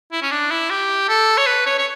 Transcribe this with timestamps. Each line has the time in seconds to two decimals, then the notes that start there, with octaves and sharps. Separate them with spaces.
0.12 E4
0.22 C#4
0.31 D4
0.51 E4
0.70 G4
1.08 A4
1.37 C#5
1.46 B4
1.66 C#5
1.78 C#5